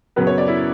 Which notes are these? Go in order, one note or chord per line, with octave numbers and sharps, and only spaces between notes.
F#2 C#3 F#3 B3 B4
C#5
D5
E4